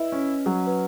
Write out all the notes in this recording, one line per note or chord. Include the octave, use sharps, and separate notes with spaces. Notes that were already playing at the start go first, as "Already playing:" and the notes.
Already playing: E4 B4 D#5
C#4
F#3
B4